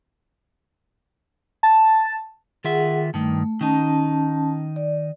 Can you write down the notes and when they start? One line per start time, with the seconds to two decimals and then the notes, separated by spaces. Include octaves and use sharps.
1.63 A5
2.64 D#3 F4 G#4 E5 F#5
3.14 G2 D#3 A3
3.61 D#3 C#4 D#4 A5
4.76 D5